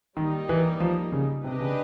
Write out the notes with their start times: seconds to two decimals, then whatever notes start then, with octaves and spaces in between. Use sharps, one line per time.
0.17 D#3 G3 A#3 D#4
0.49 E3
0.80 F3
1.12 C#3
1.44 C3 D4 G4 B4 D#5
1.60 C#3